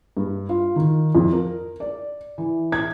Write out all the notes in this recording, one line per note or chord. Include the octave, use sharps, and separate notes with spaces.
G2
F4
D#3
F2
A#4
D5
E3
G#6